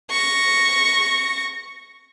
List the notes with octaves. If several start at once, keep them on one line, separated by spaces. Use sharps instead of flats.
C#6 A#6